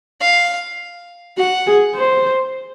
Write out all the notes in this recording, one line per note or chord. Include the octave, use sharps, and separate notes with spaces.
F5
F#4 F#5
G#4
C5